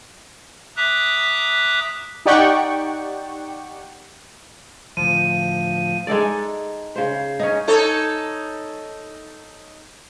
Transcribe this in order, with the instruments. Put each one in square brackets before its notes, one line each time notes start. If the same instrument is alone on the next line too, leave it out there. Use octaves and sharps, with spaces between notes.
[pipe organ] E5 A#5 D6 D#6 F#6
[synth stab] D#4 G4 D5 F#5 G5 C#6
[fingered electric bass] D1 D2 [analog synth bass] F3 [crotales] D#7
[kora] G#3 D#4 A4 D5
C#3 C5
C#4 D#4
[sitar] D#4 A4 C#5